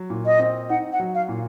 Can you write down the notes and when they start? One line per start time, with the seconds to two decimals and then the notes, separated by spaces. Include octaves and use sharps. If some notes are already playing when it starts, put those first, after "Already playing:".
Already playing: F#3
0.10 A#2
0.26 D#5
0.39 C4
0.69 D#4 F#5
0.92 F#5
1.00 F#3
1.15 F5
1.29 A#2